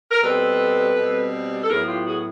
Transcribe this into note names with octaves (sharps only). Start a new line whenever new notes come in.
A#4
B2 G3 C4 A4 B4
B2 G3 C4
A4
A2 F#3 B3 E4 G#4 A#4
F4 G4
F#4 G#4